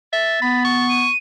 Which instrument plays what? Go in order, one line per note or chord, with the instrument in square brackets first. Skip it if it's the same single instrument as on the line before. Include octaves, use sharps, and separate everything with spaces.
[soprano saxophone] E5 [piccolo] A6
[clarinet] B3 [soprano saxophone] B5
[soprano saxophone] C#6
[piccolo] D#7